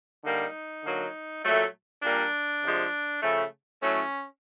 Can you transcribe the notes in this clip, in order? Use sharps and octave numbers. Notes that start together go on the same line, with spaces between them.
D3 G3 A#3 D#4
D3 F#3 A#3
A#2 F#3 A3
A#2 G3 A#3 D4
C3 F3 G#3
C#3 F3 A3
A2 F#3 A3 C#4